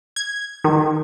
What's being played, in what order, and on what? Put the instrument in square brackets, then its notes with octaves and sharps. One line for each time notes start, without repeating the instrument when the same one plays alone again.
[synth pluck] G#6
D#3